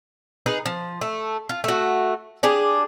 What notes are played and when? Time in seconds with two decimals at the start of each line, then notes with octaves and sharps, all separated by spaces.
0.46 D#4 G#4 B4
0.66 F3
1.01 A3
1.49 F4
1.64 A3 F#4
2.43 D4 G4 G#4